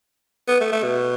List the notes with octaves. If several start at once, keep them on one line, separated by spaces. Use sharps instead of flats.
B3
A3
A3
B2